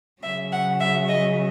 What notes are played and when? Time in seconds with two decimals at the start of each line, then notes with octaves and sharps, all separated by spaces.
0.22 C#3 F#3 E5
0.52 F#5
0.80 E5
1.09 D#5